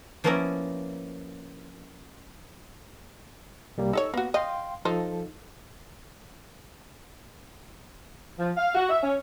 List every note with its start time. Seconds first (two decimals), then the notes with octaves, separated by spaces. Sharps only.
0.24 F3 A#3 B3 C#4 E4 A#4
3.78 C2 G3 A#3
3.93 D#4 A4 C#5 E6
4.14 A#3 B3 F#4
4.34 D#5 F5 G5 C6
4.85 F3 D#4 A4 C5
8.39 F3
8.57 F5
8.75 F#4
8.90 E5
9.03 C#4